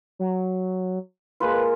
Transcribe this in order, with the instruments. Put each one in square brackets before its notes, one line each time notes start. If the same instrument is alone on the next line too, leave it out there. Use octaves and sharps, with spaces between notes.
[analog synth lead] F#3
[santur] G#3 A#3 F4 [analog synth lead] B4